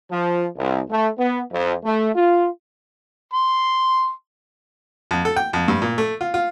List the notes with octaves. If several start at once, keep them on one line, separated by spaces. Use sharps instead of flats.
F3
C2
A3
B3
F2
A3
F4
C6
F2
A4
G5
F2
G2
A#2
A3
F4
F4